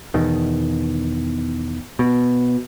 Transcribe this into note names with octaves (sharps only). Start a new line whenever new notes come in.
E2 B2 D#3
B2